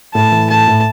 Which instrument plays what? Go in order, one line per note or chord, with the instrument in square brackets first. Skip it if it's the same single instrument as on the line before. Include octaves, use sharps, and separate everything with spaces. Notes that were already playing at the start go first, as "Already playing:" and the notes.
[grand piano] A2 [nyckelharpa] A5
[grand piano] E3
[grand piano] A2 [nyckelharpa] A5
[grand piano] A2